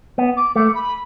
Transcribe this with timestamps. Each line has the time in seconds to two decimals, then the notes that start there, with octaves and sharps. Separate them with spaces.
0.18 B3
0.37 D6
0.56 A3 D6
0.75 B5